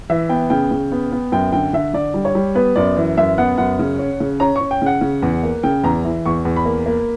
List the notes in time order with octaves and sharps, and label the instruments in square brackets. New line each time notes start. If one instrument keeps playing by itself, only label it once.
[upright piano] E3 E5
B3 G5
C#3 G5
C#3
B3
B3
F#2 G5
D3 G5
D3 E5
D3 D5
G3
C#5
G3
B3 B4
F#2 D5
E3
F#2 E5
B3 F#5
F#2 F#5
C#3
C#4
C#3
C#4 A#5
C#4 C#6
G5
C#3 F#5
C#3
E2
A#3
C#3 G5
E2 A#5
E3
E2 C#6
E2
B5
A#3
A#3